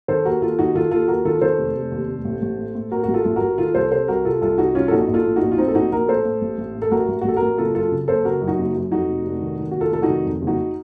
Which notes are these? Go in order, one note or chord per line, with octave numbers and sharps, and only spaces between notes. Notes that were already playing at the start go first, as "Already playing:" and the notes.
D#3 A4 C5
D#2 F#4 A#4
D#2 F4 A4
D#2 D#4 F#4
D#3 F4 A4
D#2 F4 A4
D#2 F#4 A#4
D#3 F4 A4
D#3 A4 C5
F1
F1
D#2
F1
A1
A1
A2
A2
A2 F#4 A#4
A1 F#4
F4 A4
A1
F#4 A#4
A1
D#3 F4 A4
C2 A4 C5
C3 A4 C5
C2 F#4 A#4
C3 F4 A4
C2 F4 A4
C2 D#4 F#4
C2 C#4 F4
A4
A#1 D#4 F#4
A#1
F4 A4
A2
D#4 F#4
A#1
F4
A2 C4 D#4
A4
A#1 D#4 F#4
A#1 F#4 A#4
A2 A4 C5
A2
A1
A1
A2
A4
A1 F#4 A#4
A1
F#4
A1 A4
F#4 A#4
A1
F#1 F4 A4
F#2 F4 A4
C#3
F#1 A4 C5
C#3 F#4 A#4
F#2
D#4 F#4
F#1
F#2
F2 D#4 F#4
F1
F1
D#3
D#3
F1 F#4
F4 A4
F1 A4
D#4 F#4
D#3
F2
F#1
D#4 F#4